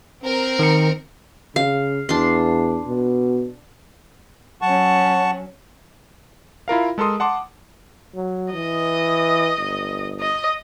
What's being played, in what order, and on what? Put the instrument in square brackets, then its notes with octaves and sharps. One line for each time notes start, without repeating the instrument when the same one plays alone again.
[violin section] C4 A#4
[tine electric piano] D#3 C#7
[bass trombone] C#3 [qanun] F5
[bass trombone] E2 [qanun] D4 C6
[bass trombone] B2
[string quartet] F#3 C#4 [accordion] F#5 A5 C#6
[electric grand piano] E4 F4 A#4 F5
G#3 A4 A#4 C6 D#6
F#5 A5 C6 D6
[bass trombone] F#3
[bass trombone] E3 [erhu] D#5
[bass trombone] G1
[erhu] D#5